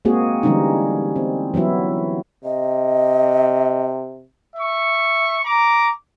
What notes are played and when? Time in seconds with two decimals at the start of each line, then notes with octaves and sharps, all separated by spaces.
0.05 G#3 A#3 C4 F#4 G#4
0.43 D3 E3 G3 G#3 C#4 D#4
1.16 C4
1.54 E3 F#3 B3 E4 F#4
2.44 C3 D#5
4.56 E5 C#6
5.45 A#5 D6